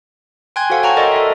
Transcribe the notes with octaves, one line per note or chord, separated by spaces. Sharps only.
G5 G#5 C6 F#6 G#6
F#4 A4 C5 F5 F#5
C#5 G5 A5 A#5 C#6
A4 A#4 D5 D#5 C6
A4 E5